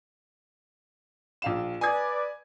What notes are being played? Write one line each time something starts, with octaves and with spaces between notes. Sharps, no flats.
A#1 F5 E7
B4 D5 G#5 D#6 G#6